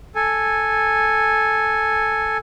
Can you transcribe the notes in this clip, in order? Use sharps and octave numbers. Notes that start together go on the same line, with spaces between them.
A4 G#5